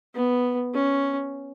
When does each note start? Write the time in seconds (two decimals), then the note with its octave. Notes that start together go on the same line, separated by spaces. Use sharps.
0.15 B3
0.74 C#4